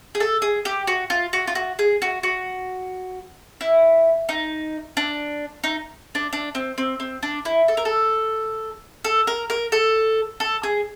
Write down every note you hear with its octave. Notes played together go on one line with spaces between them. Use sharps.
G#4
A4
G#4
G4
F#4
F4
F#4
F4
F#4
G#4
F#4
F#4
E4
D#4
D4
D#4
D4
D4
C4
C4
C4
D4
E4
A4
A#4
A4
A4
A#4
A#4
A4
A4
G#4